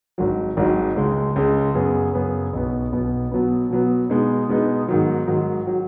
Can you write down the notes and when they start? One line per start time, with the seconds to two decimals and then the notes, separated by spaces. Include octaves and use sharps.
0.18 G#1 G#2 F#3
0.57 G#1 G#2 F#3
0.96 C#2 C#3 G#3
1.36 C#2 C#3 G#3
1.75 F#2 C#3 B3 G#4
2.14 F#2 C#3 B3 G#4
2.53 B1 B2 B3
2.93 B1 B2 B3
3.32 B2 F#3 B3
3.71 B2 F#3 B3
4.10 B2 G#3 B3 D#4
4.49 B2 G#3 B3 D#4
4.88 G#2 D#3 F#3
5.27 G#2 D#3 F#3
5.67 F#3